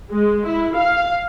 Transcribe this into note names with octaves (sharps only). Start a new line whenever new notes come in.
G#3
E4
F5